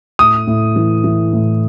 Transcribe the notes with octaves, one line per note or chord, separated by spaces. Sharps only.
A2 D#6
A2
E3
E3
A2